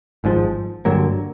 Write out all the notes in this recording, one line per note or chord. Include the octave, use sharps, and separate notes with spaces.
G#1 G#2 F3
G2 D3 F#3 A#3